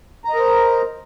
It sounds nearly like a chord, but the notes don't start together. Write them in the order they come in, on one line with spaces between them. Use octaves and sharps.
A#5 D#5 A#4 C5